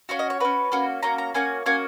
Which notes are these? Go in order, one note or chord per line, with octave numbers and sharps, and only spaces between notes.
C#4 F#4 F5
D#5
C#5
C#4 F#4 B4
A#3 C#4 F#4
A#3 C#4 F#4 A#5
A#5
A#3 C#4 F#4 G#5
A#3 C#4 F#4 G#5